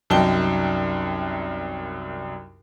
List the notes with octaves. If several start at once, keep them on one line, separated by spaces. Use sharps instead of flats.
C2 F#2 D#4 G5 A5 G7